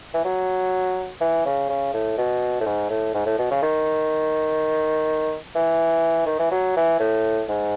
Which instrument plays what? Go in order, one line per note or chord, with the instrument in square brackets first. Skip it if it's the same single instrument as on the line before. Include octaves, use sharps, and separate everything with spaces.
[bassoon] E3
F#3
E3
C#3
C#3
A2
B2
A2
G#2
A2
G#2
A2
B2
C#3
D#3
E3
D#3
E3
F#3
E3
A2
G#2